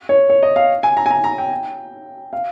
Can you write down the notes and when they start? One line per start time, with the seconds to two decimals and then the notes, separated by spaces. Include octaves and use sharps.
0.09 C#5
0.30 C#5
0.43 D#5
0.56 F5
0.83 G#5
0.97 A#5
1.06 G#5
1.10 A#5
1.24 A#5
1.38 G5
2.33 F5